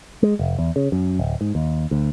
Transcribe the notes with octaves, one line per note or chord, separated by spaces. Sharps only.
G#3
F1
E2
C#3
F#2
D1
G#2
D#2
D2